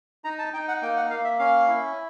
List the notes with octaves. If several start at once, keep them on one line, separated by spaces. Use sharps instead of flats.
D#4 A#5
A5
D#4 G5
F#5
A#3 G5
F#5
A#3 F5
E5
C#4 F5
E4